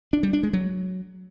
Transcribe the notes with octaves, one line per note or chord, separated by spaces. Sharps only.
D4
G3
D4
G#3
F#3